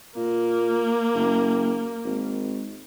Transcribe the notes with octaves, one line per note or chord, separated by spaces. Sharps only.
A#2 A#3
F#1
G#1